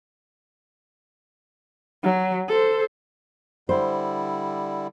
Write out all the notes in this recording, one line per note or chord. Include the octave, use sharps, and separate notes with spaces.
F#3
A4 C5
D3 G3 E4 C5